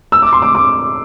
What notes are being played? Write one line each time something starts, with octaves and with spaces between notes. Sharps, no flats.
E6
D6
C6
D6
D6